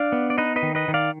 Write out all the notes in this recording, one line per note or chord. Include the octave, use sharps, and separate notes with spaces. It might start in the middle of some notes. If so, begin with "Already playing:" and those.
Already playing: D4 D5 F5
B3
D5
D#4 B4 D#5
B4 D#5
D#3
B4 D#5
D#3
D5 F5